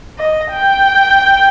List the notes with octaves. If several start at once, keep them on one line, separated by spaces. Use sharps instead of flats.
D#5
G5